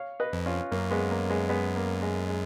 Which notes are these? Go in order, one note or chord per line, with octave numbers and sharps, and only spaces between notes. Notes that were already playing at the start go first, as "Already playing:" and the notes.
Already playing: C#5 F5
B4 D#5
F2
C#4 F4
F#2 A#3 C#4
G#3 B3
A#3
G#3 B3
G#3 B3
A#3
G#3
G#3